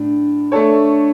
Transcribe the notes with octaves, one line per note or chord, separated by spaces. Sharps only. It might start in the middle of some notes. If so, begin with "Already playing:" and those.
Already playing: A2 D4
A3 D4 A4 C#5